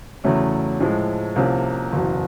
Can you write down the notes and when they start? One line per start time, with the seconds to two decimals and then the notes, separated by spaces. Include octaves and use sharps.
0.24 E2 C#3 F#3 A3 C#4
0.81 A2 F3 G#3
1.36 C2 C3 F3 A#3 C#4
1.92 F#1 E2 B2